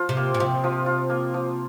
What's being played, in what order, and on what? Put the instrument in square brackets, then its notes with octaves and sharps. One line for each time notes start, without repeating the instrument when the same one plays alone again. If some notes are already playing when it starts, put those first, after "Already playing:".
Already playing: [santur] F3 F4
[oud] C3
[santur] A#3
[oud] A#2
[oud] C3 [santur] F3
[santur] F3
F4
A#3
F3